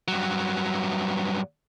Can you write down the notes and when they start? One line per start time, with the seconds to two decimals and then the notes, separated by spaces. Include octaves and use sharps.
0.08 G2 F#3